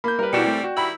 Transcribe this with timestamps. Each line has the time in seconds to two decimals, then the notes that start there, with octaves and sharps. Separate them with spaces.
0.04 A#3 B5 G6
0.19 G3 A#4 B4
0.33 B2 E3 G3 E4 F#4 C#7 E7
0.44 A3 C4 D5
0.64 F#4 G5
0.77 D#3 G3 E4 B5 E6